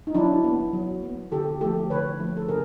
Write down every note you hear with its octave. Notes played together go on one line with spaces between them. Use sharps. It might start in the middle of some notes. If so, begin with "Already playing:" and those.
D#4
F#3 D4 E4
B3
F#3
B3
D3 G4 A4
F3 A3 G4 A4
D3 B4 C#5
F3 A3
A4
C#3 G#4 A#4